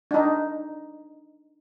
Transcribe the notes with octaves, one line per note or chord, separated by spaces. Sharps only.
D4 D#4